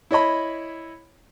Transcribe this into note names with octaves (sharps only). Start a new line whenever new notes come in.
E4 C#5 D#5 B5